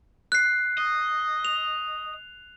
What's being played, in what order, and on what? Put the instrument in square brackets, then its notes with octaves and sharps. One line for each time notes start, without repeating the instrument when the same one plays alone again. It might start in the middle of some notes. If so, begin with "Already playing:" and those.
[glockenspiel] F#6 C7
[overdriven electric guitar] D#5
[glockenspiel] F7